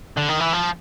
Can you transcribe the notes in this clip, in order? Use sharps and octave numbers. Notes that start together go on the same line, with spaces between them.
D3
D#3
E3
F3